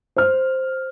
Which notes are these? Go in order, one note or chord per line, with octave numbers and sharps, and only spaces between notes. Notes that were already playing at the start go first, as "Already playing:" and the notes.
C5 F6